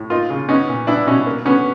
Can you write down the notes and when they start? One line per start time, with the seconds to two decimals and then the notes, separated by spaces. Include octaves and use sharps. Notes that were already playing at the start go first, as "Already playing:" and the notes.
Already playing: A2
0.10 A#3 D#4 F4
0.30 C#3
0.49 B3 C#4 D#4
0.69 A#2
0.87 B3 D4 E4
1.07 B2 C#4 D#4
1.27 A#3
1.45 D3 B3 C#4